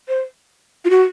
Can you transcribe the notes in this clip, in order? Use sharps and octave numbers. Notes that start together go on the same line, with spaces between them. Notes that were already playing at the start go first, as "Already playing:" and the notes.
C5
F4
F#4